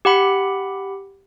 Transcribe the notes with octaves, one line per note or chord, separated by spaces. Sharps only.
G4 F#5 B5